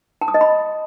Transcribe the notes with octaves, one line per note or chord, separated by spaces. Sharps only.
A5
D#6
D#5
B5